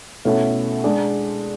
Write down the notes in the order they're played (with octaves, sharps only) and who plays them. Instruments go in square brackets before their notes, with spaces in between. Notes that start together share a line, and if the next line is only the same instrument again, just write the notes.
[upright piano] B2 A3 C#4 E4 A4
G#3 D4 G#4